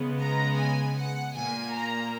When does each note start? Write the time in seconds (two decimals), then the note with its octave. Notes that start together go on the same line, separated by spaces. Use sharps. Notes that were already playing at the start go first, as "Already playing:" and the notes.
Already playing: C#3 G#3 B3
0.20 A#5
0.59 G#5
0.97 F#5
1.35 A#2 A#3 G#5
1.74 A#5